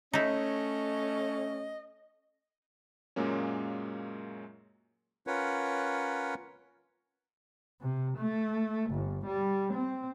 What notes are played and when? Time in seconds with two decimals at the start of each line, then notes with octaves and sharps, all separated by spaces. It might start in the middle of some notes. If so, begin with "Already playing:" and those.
0.13 A3 C#4 D#4 E4 D#5
3.16 F#2 A#2 F#3 G#3 A#3 C#4
5.27 C#4 F4 A#4 B4 C#5 F#5
7.81 C3
8.17 A3
8.91 G1
9.26 G3
9.73 C4